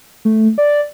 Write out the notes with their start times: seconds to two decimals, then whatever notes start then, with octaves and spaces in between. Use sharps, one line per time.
0.25 A3
0.58 D5